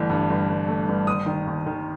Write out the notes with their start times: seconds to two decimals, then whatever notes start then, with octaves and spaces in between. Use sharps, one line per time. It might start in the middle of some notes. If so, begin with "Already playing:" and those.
Already playing: G1 E3 A3
0.09 G2
0.29 G1
0.49 G1
0.68 A3
0.88 G1
1.07 D#2 D#6
1.26 D#3
1.47 D#2
1.66 D#3